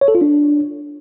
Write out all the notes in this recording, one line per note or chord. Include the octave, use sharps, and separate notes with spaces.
C#5
A4
F4
D4